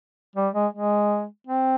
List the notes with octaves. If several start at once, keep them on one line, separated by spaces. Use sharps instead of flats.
G3
G#3
G#3
C4